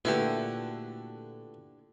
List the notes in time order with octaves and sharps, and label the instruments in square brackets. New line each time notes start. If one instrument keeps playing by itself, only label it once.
[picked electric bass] A#2 [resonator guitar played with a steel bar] D3 E4 G4 [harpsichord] A3 F#4 B4